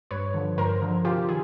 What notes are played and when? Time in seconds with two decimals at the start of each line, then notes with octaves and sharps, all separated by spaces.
0.11 G2 B4 C#5
0.34 D3 F3
0.58 G2 A#4 C5
0.82 D3 F3
1.05 C3 F4 G4
1.29 D#3 G#4